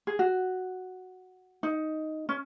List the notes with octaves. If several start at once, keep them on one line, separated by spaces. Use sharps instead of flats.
G#4
F#4
D#4
C#4